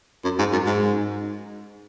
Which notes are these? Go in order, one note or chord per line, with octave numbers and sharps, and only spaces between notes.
F#2
G#2
F#2
G#2